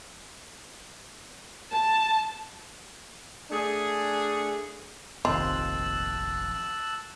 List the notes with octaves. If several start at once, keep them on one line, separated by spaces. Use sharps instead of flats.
A5
A3 D4 G#4
F1 A#1 D#2 C4 F4 A5 E6 F#6